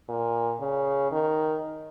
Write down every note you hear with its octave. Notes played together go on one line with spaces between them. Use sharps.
A#2
C#3
D#3